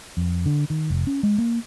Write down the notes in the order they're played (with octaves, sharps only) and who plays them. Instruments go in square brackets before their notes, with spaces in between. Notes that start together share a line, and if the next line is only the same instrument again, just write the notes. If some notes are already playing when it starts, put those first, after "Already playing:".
[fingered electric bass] F2
D3
D#3
F1
C#4
G#3
A#3